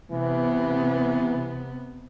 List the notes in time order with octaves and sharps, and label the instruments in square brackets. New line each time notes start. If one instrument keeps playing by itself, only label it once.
[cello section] C3 B3 [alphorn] E3